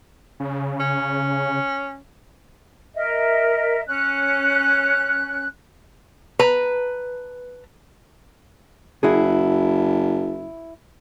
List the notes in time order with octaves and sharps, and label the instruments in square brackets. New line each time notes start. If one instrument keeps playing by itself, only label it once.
[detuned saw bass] C#3
[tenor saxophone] C#4
[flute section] A#4 D#5 E5
C#4 F#6
[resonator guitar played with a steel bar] B4 A#5
[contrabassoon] F#1 [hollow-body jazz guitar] E4 F#4 G#4